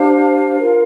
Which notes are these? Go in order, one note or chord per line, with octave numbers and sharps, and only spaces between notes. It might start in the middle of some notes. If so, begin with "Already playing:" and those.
Already playing: D4 G4 C5 F5
F4 A#4